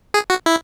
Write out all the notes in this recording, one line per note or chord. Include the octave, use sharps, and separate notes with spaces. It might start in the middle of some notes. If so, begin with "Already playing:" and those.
G#4
F#4
E4